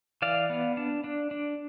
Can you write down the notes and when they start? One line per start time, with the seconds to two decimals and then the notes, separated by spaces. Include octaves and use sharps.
0.22 E3 D5 F5
0.50 B3
0.77 D4
1.04 D4
1.31 D4